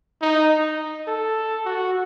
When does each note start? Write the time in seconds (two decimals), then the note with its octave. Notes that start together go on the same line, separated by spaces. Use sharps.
0.22 D#4
1.07 A4
1.66 F#4